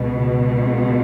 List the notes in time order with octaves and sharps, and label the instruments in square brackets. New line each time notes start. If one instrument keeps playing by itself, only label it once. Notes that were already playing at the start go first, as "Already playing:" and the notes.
Already playing: [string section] C#2 B2